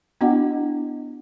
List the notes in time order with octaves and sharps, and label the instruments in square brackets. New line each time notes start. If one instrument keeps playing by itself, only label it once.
[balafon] B3 D4 E4 F#4 D#5 F#5